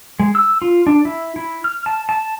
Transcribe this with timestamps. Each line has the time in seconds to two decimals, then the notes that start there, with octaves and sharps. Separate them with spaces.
0.20 G#3
0.35 E6
0.62 F4
0.87 D4
1.05 E4
1.36 E4
1.64 F6
1.86 A5
2.09 A5